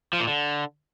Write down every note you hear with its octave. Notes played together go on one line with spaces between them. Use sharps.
F3
A#2
D3